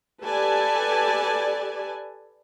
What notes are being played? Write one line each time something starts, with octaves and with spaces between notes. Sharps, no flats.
G4 A4 B4 D5 G#5 A5